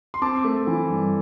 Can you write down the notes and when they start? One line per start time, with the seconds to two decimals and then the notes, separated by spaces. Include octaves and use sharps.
0.14 C6
0.22 C4 A5 D6
0.44 A3
0.67 E3
0.90 G2